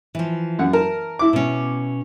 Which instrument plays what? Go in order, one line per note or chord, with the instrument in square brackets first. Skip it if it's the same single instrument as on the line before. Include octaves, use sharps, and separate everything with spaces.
[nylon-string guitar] E3 F3
[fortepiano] F#2 F#5
[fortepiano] A#4 [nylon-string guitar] A5
[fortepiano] E4 D6
[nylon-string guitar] B2 C#4